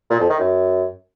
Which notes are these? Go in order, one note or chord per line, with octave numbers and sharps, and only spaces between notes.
A#2
F2
D#3
F#2